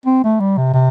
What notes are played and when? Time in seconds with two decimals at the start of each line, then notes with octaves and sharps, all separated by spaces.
0.06 C4
0.24 A3
0.40 G3
0.57 C3
0.74 C3